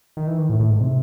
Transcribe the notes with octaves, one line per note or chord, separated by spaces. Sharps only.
D#3
E3
D#3
A2
A2
G#2
C3